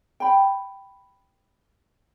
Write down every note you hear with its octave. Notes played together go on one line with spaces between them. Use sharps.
G5 B5